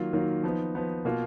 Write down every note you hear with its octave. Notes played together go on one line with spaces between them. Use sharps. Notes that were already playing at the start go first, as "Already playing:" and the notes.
Already playing: D#3 F#3 A#3 F4
D#3 F#3 A#3 F4
F3 B3 D#4
F3 B3 D#4
B2 A#3 F4